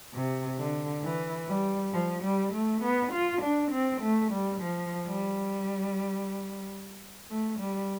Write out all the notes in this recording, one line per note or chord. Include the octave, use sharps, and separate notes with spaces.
C3
D3
E3
G3
F3
G3
A3
B3
F4
D4
C4
A3
G3
F3
G3
A3
G3